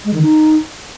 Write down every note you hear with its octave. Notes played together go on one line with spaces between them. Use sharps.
G#3
D#3
D#4